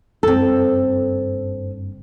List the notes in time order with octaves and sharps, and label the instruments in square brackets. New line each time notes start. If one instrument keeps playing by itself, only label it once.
[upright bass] F#1 G2 [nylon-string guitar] C4 A4